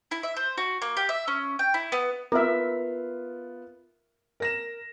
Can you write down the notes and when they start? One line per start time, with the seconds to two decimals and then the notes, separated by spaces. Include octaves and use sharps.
0.11 E4
0.23 E5
0.37 C5
0.58 F#4
0.82 A#3
0.97 G4
1.09 E5
1.28 C#4
1.59 G5
1.74 E4
1.92 B3
2.32 B3 F4 A#4 E5
4.40 A#4 A#6 E7